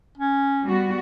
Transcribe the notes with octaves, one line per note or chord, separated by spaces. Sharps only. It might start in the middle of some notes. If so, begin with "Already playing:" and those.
C#4
G3 B3 F#4